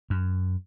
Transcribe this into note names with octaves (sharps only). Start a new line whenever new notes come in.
F#2